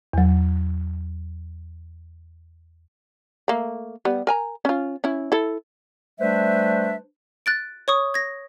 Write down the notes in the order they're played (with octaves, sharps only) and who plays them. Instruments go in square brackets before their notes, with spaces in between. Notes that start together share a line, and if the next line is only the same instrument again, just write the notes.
[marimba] E2 F#3
[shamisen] A3 A#3
G3 B3
A#4 G#5 A#5
C#4 F4
C#4 E4
E4 A4
[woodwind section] G3 A3 D4 B4 C5 E5
[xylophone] F#6 A6 D7
C#5 C#6 D#6
G#6 A#6